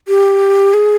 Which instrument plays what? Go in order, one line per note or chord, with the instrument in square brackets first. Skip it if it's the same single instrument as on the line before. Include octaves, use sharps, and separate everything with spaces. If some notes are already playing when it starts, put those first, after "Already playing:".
[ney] G4
G#4